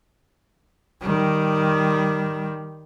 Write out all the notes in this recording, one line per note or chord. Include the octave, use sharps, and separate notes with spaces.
D#3 G3